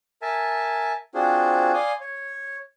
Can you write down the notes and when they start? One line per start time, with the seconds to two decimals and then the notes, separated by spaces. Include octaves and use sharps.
0.22 A#4 E5 G#5 A5
1.14 C4 D4 F4 F#4 G#4 C5
1.74 D5 F5 G#5 C6 D#6
2.00 C#5